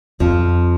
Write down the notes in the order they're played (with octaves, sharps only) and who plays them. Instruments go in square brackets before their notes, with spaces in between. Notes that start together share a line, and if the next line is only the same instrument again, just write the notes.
[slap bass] F2 [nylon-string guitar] F3